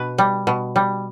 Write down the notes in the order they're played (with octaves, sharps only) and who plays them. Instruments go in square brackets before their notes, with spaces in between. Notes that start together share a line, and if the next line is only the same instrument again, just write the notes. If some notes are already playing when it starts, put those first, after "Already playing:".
Already playing: [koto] B2 B4
G3
B2
G3